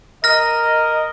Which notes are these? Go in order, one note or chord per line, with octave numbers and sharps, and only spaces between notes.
A#4 D#5 F6 A#6